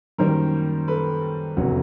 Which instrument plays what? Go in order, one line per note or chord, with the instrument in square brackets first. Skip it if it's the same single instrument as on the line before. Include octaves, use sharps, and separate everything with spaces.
[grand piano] F#2 D#3 G3 A#3 A#4 C5
A4 B4
F1 E2 C#3 F#3